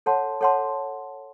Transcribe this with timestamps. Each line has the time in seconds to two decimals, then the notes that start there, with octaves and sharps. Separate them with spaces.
0.06 A4 C#5 F#5 A5 C6
0.41 A4 C#5 F#5 A5 C6